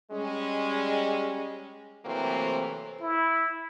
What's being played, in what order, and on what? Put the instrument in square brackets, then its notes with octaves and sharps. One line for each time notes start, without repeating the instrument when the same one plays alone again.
[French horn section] G3 G#3 C#4
C3 E3 F#3 A3 A#3 C4
[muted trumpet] E4